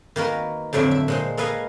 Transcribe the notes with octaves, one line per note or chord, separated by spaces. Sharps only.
D#3 A#3 F#4 A#4 B4
F2 A2 D3 F#3 D5 E5
E5
A#2 G#3 C5
A#3 A4 B4 D#5 F5 G#5